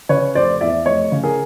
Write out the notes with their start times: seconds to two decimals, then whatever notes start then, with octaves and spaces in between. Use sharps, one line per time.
0.09 C#3 B4 C#5
0.35 F1 C5 D5
0.61 E2 D5 E5
0.85 F1 C#5 D#5
1.12 C#3
1.23 G#4 A#4